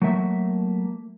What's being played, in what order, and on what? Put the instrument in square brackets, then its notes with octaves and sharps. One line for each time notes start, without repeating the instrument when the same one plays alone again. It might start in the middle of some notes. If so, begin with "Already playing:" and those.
[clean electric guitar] F#3 A3 A#3 E5